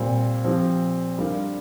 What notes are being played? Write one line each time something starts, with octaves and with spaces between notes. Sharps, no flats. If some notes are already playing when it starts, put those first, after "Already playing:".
Already playing: A#2 G3 C4
F3 C4 G4
G3 D4 F4 A#4